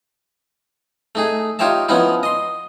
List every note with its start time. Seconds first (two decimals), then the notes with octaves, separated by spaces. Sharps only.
1.15 A3 D#4 G#4
1.59 D#4 F4 G4 C#5 E5 A5
1.89 F3 B3 C#4 D#4 E4
2.23 D#5 C6